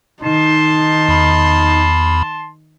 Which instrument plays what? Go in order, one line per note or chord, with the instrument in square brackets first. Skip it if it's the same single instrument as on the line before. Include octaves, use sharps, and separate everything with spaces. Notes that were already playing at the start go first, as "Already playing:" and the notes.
[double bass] D#3 [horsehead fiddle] D#4 [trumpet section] A5 C6
[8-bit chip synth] E2 B5